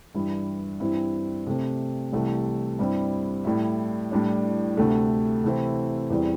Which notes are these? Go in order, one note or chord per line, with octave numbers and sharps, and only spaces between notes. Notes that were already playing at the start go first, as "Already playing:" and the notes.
G2 E3 G3 E4
G2 E3 C4 E4
C3 A3 C4
C2 C3 E3 A3
G2 G3 C4 E4
A2 G3 E4
A2 G3 D4
D2 C3 A3
C3 E3 A3 C4 E4
E2 E3 G3 C4